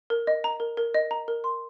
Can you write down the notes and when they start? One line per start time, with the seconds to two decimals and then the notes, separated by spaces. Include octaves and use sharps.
0.10 A#4
0.27 D#5
0.44 A#5
0.60 A#4
0.77 A#4
0.94 D#5
1.11 A#5
1.28 A#4
1.44 C6